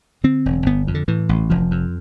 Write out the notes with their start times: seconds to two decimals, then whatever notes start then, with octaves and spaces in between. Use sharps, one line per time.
0.24 D3 C4
0.46 E1
0.66 G1 B3
0.87 F2
0.94 D3
1.08 A2 E3
1.29 A1
1.50 F1 F3
1.71 F2